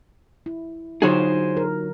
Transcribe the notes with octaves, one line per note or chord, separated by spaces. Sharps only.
E4
D3 F#3 D#4 F4 F#4 G#4 C5 C#5
A#4